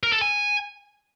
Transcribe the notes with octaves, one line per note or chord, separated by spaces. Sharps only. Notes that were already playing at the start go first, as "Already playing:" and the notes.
A#4
A4
G#5